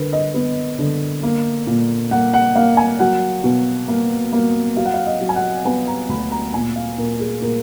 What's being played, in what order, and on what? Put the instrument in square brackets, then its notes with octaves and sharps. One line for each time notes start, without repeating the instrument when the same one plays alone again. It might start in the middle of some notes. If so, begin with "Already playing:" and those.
Already playing: [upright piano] D3 A#4 B4
D#5
B3
D3
A#3
A#2
A#3 F#5
F#5
A#3 F5
G#5
F#3 F#5
B2
A#3
A#3
F#3 F5
F#5
F5
D#5
F#3
G#5
F#5
B3 G#5
A#5
D2 B5
A#5
A#2 G#5
F5
A#2 A#4
G#4
A#2 A#4